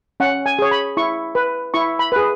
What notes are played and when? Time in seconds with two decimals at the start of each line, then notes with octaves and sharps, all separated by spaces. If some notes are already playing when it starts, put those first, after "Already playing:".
0.20 C#4 F#5
0.46 G#5
0.59 G#4 C#5
0.71 B5
0.97 E4 C#6
1.35 B4
1.74 E4 C#6
1.99 B5
2.12 G#4 B4